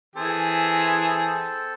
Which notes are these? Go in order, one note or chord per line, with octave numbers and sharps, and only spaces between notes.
E3 C4 G#4 A4